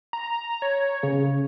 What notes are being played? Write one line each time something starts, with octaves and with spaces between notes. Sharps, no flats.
A#5
C#5
C#3